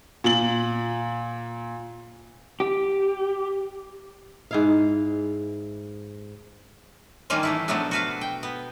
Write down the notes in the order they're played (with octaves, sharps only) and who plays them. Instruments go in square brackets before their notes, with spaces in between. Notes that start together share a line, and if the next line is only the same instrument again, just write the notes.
[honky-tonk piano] A#2 F#7
[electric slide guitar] G4
[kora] G#2 E4 F5
[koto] D#3 G3 A#3 C#4 F4
E3 A3 E4
B2 F3 F#3 A3 B3 D4
F#4 B4 F5
G5
B3